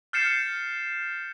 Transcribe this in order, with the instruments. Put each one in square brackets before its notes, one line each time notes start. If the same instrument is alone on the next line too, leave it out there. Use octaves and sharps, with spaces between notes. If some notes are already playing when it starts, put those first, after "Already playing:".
[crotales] F6 G6 A6 C7 C#7 E7